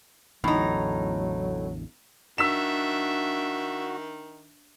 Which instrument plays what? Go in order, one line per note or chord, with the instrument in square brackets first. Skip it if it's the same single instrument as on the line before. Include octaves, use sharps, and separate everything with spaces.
[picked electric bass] A1 E2 D3 [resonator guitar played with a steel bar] A2 D#4 [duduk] F#3
[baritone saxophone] D#3 [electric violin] D4 E5 [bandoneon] F#4 [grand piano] E6 B6 E7